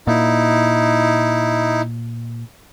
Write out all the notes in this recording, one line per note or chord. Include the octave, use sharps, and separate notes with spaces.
A#2 D#4 E4